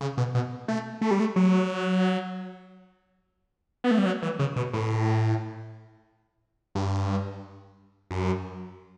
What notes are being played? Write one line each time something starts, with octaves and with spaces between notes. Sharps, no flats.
C#3
B2
B2
A3
A3
G3
A3
F#3
B3
A3
G3
F#3
E3
C#3
B2
A2
G2
F#2